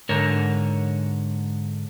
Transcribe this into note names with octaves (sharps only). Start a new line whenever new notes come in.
G#2 D3 A#4 C#5